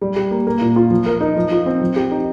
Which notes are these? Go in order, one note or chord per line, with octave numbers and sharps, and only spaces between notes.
G3
G4
A#3
A#3
A#2
F4
F3
A#4
D#4
F3
F4
C4
F3
G4
D#4